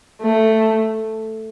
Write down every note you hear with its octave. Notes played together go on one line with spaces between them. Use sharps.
A3